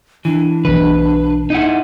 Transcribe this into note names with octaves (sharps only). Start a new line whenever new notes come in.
E3 D4
B1 E3 B4
D#4 E4 F#5